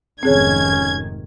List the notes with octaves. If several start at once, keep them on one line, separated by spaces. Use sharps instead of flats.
F1 G#2 D#3 C4 C#4 G#4 C#5 G#6